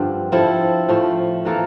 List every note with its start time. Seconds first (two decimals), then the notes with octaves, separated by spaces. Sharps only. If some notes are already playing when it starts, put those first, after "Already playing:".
Already playing: G2 D3 F3 C4
0.32 F3 C4 E4 A4
0.88 A2 F3 A3
1.45 E3 A#3 F4 A4